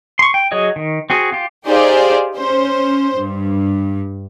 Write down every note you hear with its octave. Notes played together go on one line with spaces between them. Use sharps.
C6 C#6
G5
F#3 G#4 C#5 D#5
D#3
C4 F#4 G#4
F4 G4
D#4 G4 G#4 C5 D5 F5
C#4 C5
G2